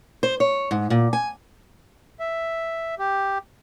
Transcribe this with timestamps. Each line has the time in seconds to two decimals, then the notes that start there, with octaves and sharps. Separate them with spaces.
0.23 C5
0.40 C#5
0.71 G#2
0.90 A#2
1.13 G#5
2.20 E5
2.99 G4